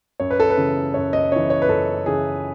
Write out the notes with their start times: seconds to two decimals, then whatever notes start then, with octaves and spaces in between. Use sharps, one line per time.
0.20 F#2 C#5
0.31 B4
0.40 A4
0.50 B4
0.57 C#3 E3
0.94 F#2 C#5
1.13 D#5
1.32 C#3 E3 C#5
1.50 C#5
1.62 B4
1.68 F#2 A4
2.06 C#3 E3 G#4